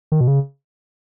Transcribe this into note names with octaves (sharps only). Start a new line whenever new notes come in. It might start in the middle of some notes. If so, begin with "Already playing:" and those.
D#3
B2
C#3